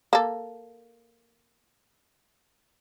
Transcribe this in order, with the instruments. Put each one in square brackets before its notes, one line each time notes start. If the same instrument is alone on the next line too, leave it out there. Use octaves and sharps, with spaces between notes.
[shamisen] A#3 A4